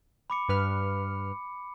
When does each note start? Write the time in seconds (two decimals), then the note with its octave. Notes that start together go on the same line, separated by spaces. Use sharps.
0.30 B5 D6 C#7
0.49 G2 B4 F6